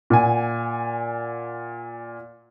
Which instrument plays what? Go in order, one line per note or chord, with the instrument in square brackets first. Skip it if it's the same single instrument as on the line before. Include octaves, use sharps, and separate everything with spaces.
[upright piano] A#2 F#5 G#5